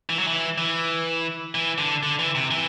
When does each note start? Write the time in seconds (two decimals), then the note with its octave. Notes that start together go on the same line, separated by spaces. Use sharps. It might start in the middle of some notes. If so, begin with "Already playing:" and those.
0.09 E3
0.19 F#3
0.28 E3
0.58 E3
1.55 E3
1.78 D3
2.03 D3
2.19 E3
2.35 C3
2.51 E3